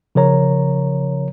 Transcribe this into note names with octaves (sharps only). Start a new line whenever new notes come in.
C#3 F3 A#4 C#5 A#5